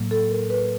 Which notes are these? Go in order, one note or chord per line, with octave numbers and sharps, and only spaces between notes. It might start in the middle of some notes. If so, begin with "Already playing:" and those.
Already playing: A2 F#3 A#3
A4
A#4
B4